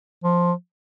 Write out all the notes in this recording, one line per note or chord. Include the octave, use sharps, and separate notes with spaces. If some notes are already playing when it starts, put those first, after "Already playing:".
F3